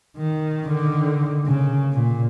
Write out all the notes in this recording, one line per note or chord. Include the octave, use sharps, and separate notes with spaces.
D#3
D3 D#3
C#3
A#2